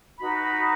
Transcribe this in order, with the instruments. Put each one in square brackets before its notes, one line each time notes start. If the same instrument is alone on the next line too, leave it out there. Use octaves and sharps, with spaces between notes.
[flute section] D#4 F#4 B4 B5